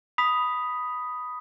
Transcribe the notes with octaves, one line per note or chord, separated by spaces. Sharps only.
B5 D#6 B6